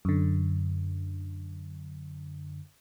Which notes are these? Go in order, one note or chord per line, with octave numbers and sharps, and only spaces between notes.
F#2 D3